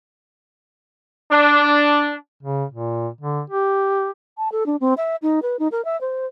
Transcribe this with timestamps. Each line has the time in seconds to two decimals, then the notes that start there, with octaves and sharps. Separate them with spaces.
1.31 D4
2.43 C#3
2.72 A#2
3.21 D3
3.50 G4
4.38 A5
4.52 A4
4.66 D4
4.80 C4
4.97 E5
5.22 D#4
5.42 B4
5.59 D#4
5.72 A#4
5.85 E5
6.01 C5